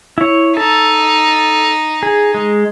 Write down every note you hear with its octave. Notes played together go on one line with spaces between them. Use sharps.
E4 C#5
D#4 A4 A5
G#4
G#3